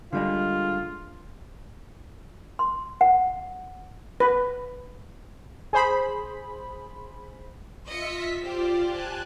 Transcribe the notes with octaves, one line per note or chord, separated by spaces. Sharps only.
D3 G3 G#3 F4
C6
F#5
B4
G#4 C5 B5
F4 D#5 E5 B6 C#7
F4 G4 C5 D5
G#5 A5 F#6